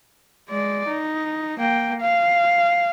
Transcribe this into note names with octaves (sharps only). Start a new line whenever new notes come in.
G#3 D5
D#4
A#3 G5
F5